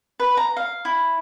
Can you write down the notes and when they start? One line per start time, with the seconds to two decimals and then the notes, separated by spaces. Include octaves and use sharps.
0.20 B4
0.37 A#5
0.57 F5
0.85 E4